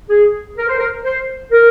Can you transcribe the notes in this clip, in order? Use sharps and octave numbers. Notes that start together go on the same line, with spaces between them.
G#4
A#4
C5
A#4
C5
A#4